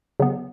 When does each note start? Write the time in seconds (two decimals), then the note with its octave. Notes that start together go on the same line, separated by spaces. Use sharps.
0.20 C#3 F#3 B3